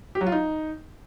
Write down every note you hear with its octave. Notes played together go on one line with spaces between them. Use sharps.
G4
F#3
F4
D#4